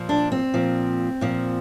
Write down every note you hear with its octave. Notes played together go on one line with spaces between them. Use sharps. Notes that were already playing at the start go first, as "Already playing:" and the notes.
Already playing: A#2 F3
D4
C4
A#2 F3
A#2 F3